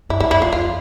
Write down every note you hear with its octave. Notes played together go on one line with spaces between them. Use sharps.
G2 E4
F#2 E4
F2 E4
F2 F4
F2 F4